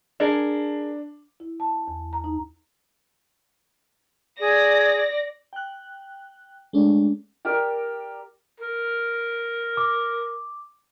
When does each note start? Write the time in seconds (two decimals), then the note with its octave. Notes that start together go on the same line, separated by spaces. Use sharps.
0.20 D4 G#4 A#4
1.40 E4
1.60 A5
1.88 E2
2.13 A#5
2.24 D#4
4.40 G#4 D5 A#6
5.53 G5 F#6
6.73 G#3 A3 C#4 D4
7.45 G4 A#4 D5 G5
8.60 A#4
9.77 D6